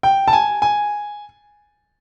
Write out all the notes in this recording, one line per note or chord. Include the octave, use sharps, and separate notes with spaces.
G5
A5
G#5
G#5